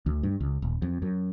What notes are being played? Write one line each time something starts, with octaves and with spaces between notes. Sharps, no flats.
D2
G2
C#2
D#1
F2
F#2